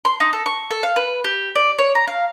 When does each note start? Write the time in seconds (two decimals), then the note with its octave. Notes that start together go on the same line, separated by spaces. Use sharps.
0.05 C6
0.20 D#4
0.33 A4
0.46 C#6
0.71 A4
0.83 F5
0.96 B4
1.24 G4
1.55 D5
1.78 C#5
1.95 A#5
2.07 F5